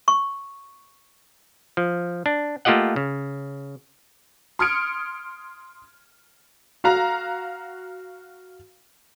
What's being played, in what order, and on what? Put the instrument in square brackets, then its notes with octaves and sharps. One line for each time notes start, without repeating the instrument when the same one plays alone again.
[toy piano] C#6
[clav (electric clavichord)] F3
D4
A3 A#3 F4 G4 D#5 F#5
C#3
[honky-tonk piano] C6 D#6 F6 G#6 C#7 D7
F#4 F5 A#5